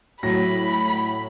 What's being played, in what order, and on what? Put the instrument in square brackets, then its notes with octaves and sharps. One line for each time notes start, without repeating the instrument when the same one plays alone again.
[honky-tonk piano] A2 F#3 A#6 [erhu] B5